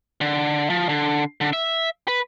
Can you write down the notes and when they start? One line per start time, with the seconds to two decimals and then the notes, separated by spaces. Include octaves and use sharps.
0.21 D3
0.70 F3
0.89 D3
1.41 D3
1.53 E5
2.08 B4